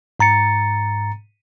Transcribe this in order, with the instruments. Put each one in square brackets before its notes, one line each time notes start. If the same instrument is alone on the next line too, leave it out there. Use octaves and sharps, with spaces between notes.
[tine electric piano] G#2 A#5 A6 C#7